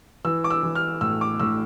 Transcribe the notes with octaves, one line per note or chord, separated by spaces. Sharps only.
E3 E6
D6
E6
E3
F6
A2 E6
D6
A2 E6